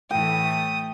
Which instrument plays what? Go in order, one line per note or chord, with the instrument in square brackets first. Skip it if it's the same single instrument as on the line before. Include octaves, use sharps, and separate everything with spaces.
[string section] A2 E3 A3 [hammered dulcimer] G5 [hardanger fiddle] D#6